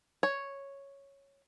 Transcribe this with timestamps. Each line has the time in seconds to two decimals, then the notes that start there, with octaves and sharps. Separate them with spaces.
0.23 C#5